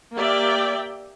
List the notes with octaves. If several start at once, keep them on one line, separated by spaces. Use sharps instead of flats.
A#3 G4 D5 E5 G5